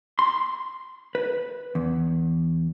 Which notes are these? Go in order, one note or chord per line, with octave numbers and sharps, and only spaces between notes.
C6
B4
E2